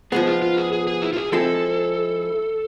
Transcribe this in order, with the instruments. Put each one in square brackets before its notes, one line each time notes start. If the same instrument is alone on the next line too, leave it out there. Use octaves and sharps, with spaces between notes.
[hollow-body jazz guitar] F3 G#3 B3 [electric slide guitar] G#4
[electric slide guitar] F4
F4
G#4
G#4
G#4
E4
F4
G#4
[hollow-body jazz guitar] F3 G#3 C4 E4 [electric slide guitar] A4